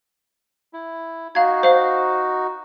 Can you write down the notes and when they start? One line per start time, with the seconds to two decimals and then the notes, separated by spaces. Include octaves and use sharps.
0.73 E4
1.35 D#4 F#4 F5 G#6
1.63 C5 F5